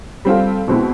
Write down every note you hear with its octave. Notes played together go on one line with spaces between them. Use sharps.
G3 C4 F4 A4
B2 G#3 C4 E4